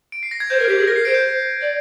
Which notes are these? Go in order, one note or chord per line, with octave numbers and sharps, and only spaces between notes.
D7
C7
A#6
G#6
C5 G6
A#4
G4 G#6
G#4
A#4 A#6
C7
C5 D7
G6
D5